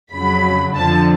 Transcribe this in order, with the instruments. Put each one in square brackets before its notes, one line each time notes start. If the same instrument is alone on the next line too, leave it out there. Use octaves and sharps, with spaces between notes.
[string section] F2 C#3 F#3 B5
F2 D3 F3 A5